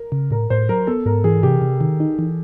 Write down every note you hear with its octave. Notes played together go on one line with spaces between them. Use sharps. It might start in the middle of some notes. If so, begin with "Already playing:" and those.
Already playing: A#4
C#3
A2 A#4
A2 C5
F#3 A#4
B3 A4
G#2 A#4
E3 G#4
C3 G4
C3
D#3
D#4
E3